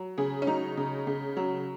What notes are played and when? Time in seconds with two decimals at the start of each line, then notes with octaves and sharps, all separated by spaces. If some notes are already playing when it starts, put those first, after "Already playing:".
Already playing: F#3
0.18 C#3 G#4
0.42 C#4
0.47 F#3 D#4
0.77 C#3
1.07 C#3
1.37 F#3